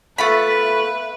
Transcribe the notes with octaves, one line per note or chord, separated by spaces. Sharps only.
A3 F4 B4 E5 B5